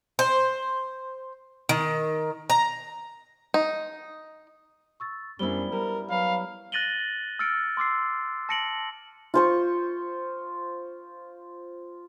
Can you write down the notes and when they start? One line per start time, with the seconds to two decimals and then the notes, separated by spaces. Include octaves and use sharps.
0.19 C5
1.69 D#3
2.50 A#5
3.54 D#4
5.00 C#6 E6 A6
5.39 F#2 G3 B3 D4 E4 C5 G7
5.72 G3 A#4
6.10 F#3 B4 F5 B5
6.72 F#6 A6 A#6 D#7 F#7 G7
7.39 E6 F6 A6 C#7 D7
7.77 C6 D6 E6 C7
8.49 A5 A#6 C#7 D7 F#7
9.34 F4 C5 C#6